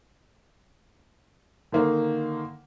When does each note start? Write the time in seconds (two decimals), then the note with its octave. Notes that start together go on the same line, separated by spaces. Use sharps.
1.72 D3 D#3 A#3